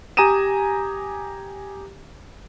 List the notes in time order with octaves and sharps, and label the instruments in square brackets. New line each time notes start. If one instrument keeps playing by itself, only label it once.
[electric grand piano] G4 G#5 A#5 D#6 D#7 E7